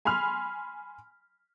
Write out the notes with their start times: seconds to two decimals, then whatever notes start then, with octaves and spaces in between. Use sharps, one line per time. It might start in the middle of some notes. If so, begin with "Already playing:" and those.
0.05 G#5 B5 C6 F6